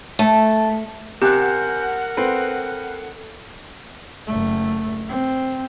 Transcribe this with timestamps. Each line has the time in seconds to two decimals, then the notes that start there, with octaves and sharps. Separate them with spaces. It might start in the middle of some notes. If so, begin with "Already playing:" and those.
0.19 A3
1.22 C3 G4 A#4 F#5 G#5 F#6 G6
2.17 C4 A4 B4
4.27 F#1 A3
5.09 C4